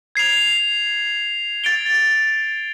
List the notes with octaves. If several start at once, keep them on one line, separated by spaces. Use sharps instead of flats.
G#6 C7 F7
A6 D7 G7